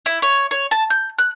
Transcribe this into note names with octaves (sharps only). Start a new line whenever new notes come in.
E4
C#5
C#5
A5
G6
F#6